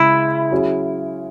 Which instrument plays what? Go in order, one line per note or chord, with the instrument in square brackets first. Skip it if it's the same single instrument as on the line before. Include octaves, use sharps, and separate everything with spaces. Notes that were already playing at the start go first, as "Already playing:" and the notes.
Already playing: [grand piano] C#3 G#3 [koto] E4
[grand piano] F#3 C#4 G#4